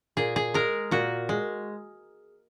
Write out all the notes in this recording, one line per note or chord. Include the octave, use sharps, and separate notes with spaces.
A#2 G#4
G#4
G#3 A#4
A#2 F#4
G#3